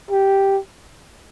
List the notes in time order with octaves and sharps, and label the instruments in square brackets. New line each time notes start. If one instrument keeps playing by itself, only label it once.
[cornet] G4